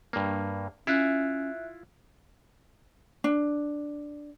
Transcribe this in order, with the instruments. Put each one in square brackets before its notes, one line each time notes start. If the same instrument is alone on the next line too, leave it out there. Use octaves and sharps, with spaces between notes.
[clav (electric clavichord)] G2 A#3
[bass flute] C#4 [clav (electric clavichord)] E4 F4 [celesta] E5 F#6
[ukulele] D4